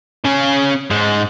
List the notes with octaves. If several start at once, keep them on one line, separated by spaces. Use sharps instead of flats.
C#3 C#4
G#2 G#3